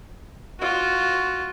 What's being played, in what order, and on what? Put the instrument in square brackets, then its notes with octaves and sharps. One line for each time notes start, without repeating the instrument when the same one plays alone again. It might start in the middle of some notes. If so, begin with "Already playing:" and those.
[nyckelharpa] F4 F#4